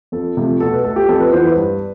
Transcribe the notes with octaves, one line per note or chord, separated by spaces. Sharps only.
F2 A4
C3 F3 A3
B2 A4
B4
A3 A4
G4
F2 A4
B4
E3 B3 C5
B4
G2